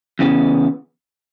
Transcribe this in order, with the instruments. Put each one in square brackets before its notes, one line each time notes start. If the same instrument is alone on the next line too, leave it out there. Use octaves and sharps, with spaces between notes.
[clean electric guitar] E2 C#3 E3 B3